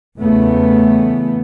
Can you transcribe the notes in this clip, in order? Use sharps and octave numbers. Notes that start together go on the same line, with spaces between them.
E2 C#3 E3 A3 B3